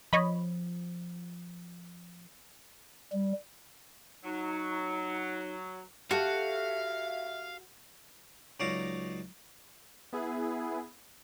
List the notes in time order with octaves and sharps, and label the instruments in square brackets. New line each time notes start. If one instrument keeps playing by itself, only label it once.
[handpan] F3 [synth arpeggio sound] C#5 D#5 B5
[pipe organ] G3
[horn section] F#3 [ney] D#4
[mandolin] F#4 [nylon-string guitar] G4 A4 [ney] E5 [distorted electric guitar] F5
[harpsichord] C#2 F#3 D#4 D5 F5 A#5
[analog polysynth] B3 E4 G#4